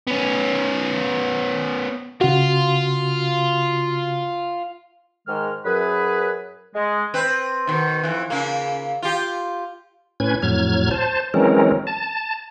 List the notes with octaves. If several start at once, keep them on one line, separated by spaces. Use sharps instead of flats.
B3 C#4
C#3 F4 F#4
G#2 D#3 G#3 F6
F#2 F#3 G#4 B4
G#3
C4 B4
B2 D#3
F2 E3
C#3 A#3
F4 G4
A2 C#4 B4 G#6
F2 A2 F#3 F6 G#6
C5 A5
E3 F#3 G#3 C4 C#4 A#4
A5